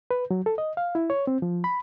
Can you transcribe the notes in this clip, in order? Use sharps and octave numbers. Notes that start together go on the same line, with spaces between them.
B4
F#3
A4
D#5
F5
E4
C#5
C4
F3
B5